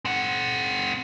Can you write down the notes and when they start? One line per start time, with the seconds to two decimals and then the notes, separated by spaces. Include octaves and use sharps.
0.05 C4 F#5